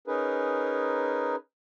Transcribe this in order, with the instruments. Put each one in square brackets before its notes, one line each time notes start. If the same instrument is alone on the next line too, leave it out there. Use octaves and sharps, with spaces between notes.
[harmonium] C#4 D#4 G#4 A#4 B4